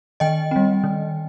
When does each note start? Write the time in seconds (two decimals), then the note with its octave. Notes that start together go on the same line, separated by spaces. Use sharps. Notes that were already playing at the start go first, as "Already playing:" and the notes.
0.20 D#3 D#5 G5
0.51 G3 C4
0.84 D#3